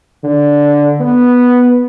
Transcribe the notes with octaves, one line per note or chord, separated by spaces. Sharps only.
D3
B3